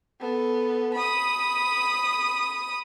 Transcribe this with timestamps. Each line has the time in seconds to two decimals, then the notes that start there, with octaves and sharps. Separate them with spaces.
0.20 B3 A4
0.93 B5 D#6